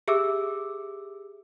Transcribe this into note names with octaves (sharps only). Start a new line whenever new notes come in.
G4 G#4 E5 D6 E6